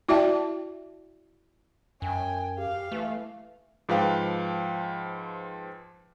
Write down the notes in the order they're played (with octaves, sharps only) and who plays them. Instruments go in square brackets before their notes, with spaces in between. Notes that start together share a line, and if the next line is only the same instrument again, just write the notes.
[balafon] E4 F#4 D5 E5 G5 A5
[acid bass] F#2 [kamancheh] G5 G#5
[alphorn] G4 [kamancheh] F5
[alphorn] E3 [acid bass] A3
[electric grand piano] G#2 F3 B4 F5 G5